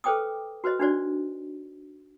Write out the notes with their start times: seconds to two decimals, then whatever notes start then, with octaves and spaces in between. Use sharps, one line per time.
0.04 A4 B4 C5 G5 D6 D#6
0.64 F#4 B4 C5 D#5
0.79 D4 D#4 F#4 C5 D5